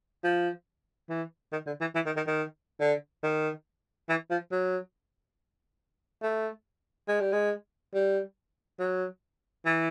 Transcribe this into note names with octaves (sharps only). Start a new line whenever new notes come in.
F3
E3
D#3
D3
E3
E3
D#3
D#3
D#3
D3
D#3
E3
F3
F#3
A3
G#3
G3
G#3
G3
F#3
E3